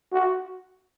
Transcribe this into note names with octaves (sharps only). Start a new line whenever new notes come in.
F#4